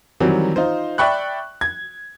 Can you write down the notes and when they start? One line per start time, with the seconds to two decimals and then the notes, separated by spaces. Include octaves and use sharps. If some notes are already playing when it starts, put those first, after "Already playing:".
0.20 D#3 E3 F#3 G3 C4
0.56 D#4 F4 C5
0.98 D5 E5 G5 B5 C#6 F#6
1.61 G#6